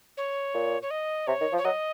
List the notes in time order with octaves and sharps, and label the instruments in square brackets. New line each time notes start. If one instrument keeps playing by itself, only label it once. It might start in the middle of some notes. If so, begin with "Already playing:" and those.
[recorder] C#5
[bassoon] A#2
[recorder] C#5
D#5
[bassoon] C3 [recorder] C#5
[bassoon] D#3
F3
[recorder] C#5
[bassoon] F#3 [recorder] D#5